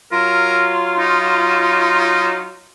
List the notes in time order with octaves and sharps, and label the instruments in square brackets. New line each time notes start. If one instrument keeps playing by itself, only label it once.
[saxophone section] F#3 F4 [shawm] A#4
[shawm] D#4